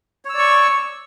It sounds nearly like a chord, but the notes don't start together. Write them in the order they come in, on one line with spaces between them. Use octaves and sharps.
C#5 E6 D5 C#6